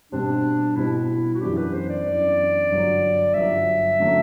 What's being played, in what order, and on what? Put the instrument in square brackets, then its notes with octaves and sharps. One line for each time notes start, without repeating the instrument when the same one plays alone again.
[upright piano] B2 G3 C4 G4 [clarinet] D4
[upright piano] B2 G3 C4 G4 [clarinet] E4
[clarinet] F#4
[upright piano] F#2 E3 B3 D4 [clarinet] G4
[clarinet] B4
C5
D5
[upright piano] F#2 E3 B3 D4
G1 G2 F#3
[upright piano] G1 G2 F#3 [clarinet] E5
[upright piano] D3 F#3 A3